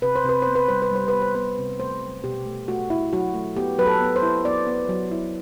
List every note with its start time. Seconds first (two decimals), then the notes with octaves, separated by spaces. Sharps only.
0.02 C3 B4
0.16 C5
0.24 C3 B4
0.42 B3 C5
0.56 B4
0.69 G3 C5
0.82 B4
0.91 G3 C5
1.08 B3 B4
1.22 C5
1.35 B3 B4
1.58 C3
1.80 A3 C5
2.02 F#3
2.24 B2 G4
2.46 A3
2.68 A3 F#4
2.90 A3 E4
3.13 F#3 F#4
3.34 A3
3.56 B3 G4
3.78 F#3 B4
3.86 A4
4.01 B3
4.16 C5
4.22 E4
4.45 B3 D5
4.67 B3
4.89 F#3
5.11 E4